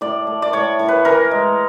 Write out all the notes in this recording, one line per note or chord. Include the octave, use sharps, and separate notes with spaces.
A2 D5
A3
D5
A2 C#5
A2
B4
E3 A#4
G#3